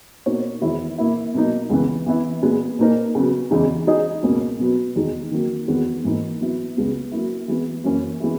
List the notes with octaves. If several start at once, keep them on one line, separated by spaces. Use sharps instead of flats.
B2 A#3 D#4 F#4 C#5
E2 D#3 G#3 B3 E4
A#2 A#3 E4
B2 F#3 A#3 D#4
C#2 C#3 E3 B3
E3 B3 E4
A#2 G#3 B3
A#2 A#3 D#4 A#4
C#3 F#3 B3
E2 C#3 E3 G#3 D#4
G#3 D#4 G#4 D#5
C#2 B2 A#3 C#4
B2 F#3 B3
E2 D#3 G#3 D#4
D#3 F#3 A#3
E2 D#3 G#3 B3 F#4
G#2 E3 A#3 D#4
F#3 B3 E4
C#2 C#3 G#3 B3
F#3 A#3 E4
E3 G#3 B3
F#2 E3 A#3 C#4
E3 G#3 B3 E4